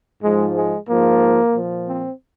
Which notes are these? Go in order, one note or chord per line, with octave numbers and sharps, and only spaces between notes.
G#2 F3 G#3
G#3
G#2 F3 A#3
A#2 F3
C4